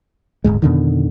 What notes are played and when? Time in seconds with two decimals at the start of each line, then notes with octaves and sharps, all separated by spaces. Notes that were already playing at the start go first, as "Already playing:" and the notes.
0.44 D1 F2 G#2 G#3
0.62 F2 B2 D3 D#3